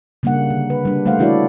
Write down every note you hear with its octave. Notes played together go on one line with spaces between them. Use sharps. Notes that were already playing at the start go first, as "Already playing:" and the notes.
C#3 G3 A#3 D4 F#5
D3
B4
G3 D4
G3 A3 C5 F5 F#5
E3 D4 E4 F#4 C#5 D5